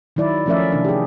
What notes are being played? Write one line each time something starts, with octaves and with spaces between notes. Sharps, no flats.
D#3 F#3 E4 D5
F3 A3 C#4 A#4 D5 E5
C3 D#3 E3 D4
G4 G#4